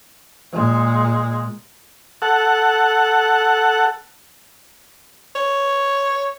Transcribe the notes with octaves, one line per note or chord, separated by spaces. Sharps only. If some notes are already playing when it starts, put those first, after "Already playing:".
A#2 G#3
A4 F#5
C#5